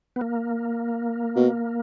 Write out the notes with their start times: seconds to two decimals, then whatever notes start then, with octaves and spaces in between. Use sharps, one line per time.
0.16 B3
0.21 A#3
1.36 B2